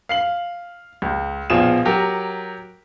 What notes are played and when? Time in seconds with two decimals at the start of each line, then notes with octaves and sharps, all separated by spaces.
0.09 F5 C7 F#7
1.02 C#2
1.50 A#1 B2 F3 F4 G#4 E7
1.85 F#3 G4 A#4